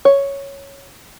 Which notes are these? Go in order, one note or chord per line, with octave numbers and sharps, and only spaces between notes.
C#5